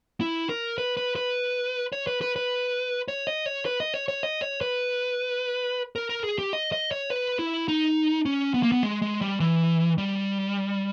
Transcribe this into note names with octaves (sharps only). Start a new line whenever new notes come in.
E4
A#4
B4
B4
B4
C#5
B4
B4
B4
C#5
D#5
C#5
B4
D#5
C#5
C#5
D#5
C#5
B4
A#4
A#4
G#4
G4
D#5
D#5
C#5
B4
E4
D#4
C#4
B3
A#3
B3
G#3
G#3
G3
E3
G3